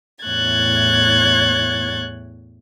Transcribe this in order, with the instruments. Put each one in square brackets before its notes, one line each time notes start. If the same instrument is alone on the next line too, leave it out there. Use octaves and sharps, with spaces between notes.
[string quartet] E2 A2 C#5 F#6 G#6 A6